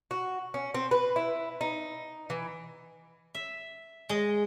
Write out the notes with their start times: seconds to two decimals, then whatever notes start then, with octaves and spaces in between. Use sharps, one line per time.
0.11 F#4
0.54 C#4
0.74 C4
0.91 B4
1.16 E4
1.61 D#4
2.30 E3
3.35 E5
4.09 G#3 D#5